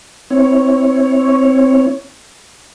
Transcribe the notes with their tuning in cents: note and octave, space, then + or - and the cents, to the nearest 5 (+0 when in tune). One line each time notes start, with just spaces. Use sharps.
C4 +0 E4 -25 C#5 +0